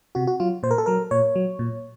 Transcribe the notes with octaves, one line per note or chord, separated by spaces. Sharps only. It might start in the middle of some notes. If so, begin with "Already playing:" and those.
C3 F#4
F#4
F#3 F4
A#2 C5
A#4
A4
F#3 A#4
A#2 C#5
F#3
A#2